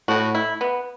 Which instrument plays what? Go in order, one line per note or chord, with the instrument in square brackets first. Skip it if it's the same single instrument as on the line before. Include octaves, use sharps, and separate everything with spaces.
[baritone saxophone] A2 [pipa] F#4
[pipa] E4
B3